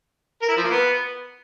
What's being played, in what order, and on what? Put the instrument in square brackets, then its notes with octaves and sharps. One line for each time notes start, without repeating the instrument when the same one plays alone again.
[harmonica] A#4
E4
F3
A#3
B3